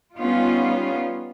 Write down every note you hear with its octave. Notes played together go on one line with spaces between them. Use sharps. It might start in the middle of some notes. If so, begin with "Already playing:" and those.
G3 B3 C#4 D#4 F4